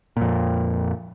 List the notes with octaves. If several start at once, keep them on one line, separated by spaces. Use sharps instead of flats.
F2 A#2